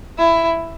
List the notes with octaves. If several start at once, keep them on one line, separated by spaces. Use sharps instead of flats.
E4